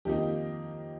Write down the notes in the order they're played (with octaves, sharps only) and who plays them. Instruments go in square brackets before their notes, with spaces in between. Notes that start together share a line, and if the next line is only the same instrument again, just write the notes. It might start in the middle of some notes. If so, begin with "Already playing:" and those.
[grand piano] F2 D#3 A#3 D#4 G4